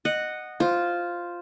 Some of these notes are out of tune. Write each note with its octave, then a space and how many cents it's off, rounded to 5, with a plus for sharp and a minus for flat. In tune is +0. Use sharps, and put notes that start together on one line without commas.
D#5 -15 F#5 +0
F4 +0 C5 +0